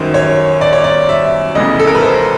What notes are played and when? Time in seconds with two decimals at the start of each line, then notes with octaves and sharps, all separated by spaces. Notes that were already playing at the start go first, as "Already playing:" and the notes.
Already playing: G1 F#2 D#3 F#3 C5
0.14 C#5
0.61 D5
0.73 C#5
0.84 D5
1.09 E5
1.55 F1 E2 C#3 D#5
1.80 A4
1.87 A#4
1.94 B4
2.02 C5